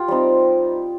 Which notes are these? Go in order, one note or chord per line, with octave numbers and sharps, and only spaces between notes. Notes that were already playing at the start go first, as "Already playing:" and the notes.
Already playing: F4 G4
G3 C4 D#4